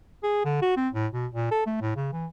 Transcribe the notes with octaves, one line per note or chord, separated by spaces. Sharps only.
G#4
D3
F#4
C4
A2
B2
A#2
A4
A3
A2
C#3
E3